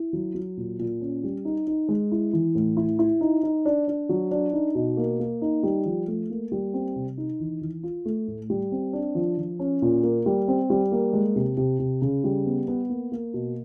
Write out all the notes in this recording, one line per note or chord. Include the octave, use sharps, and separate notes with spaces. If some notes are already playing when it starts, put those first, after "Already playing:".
Already playing: E4
F#3
F#3
A#2
A#2
C#4
G3
D#4
D#4
G#3
E4
E3
A2
E4
E4
D#4
D#4
D4
D4
F#3
D4
D#4
B2
A#3
A#3
D#4
G3
F3
A3
A#3
G3
C4
C3
D#4
E3
E3
F4
A3
A2
G3
C4
D4
F3
F3
C#4
A#2
A#3
G3
C4
G3
A#3
G#3
C3
C3
C3
C#3
G3
B3
B3
A#3
A#3
B2